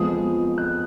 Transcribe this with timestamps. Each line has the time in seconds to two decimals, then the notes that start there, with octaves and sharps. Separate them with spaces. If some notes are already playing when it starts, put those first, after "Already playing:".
Already playing: F2 F3 G#3 B3 D#6
0.58 F#6